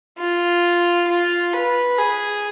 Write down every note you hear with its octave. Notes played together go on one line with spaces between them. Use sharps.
F4
F4
B4
G#4